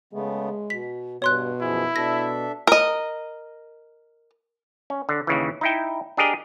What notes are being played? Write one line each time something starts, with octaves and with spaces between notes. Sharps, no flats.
C#3 G#3 A3 B3
B2 B6
G2 B2 C#5 C6 F#6
F#2 F3 E4 G#4
B2 D4 A4 E5 A#6
A#4 D#5
C#4
D3
D#2 C#3 E3
D#4 E4 G5
D4 G4 G#4 A#4 D#5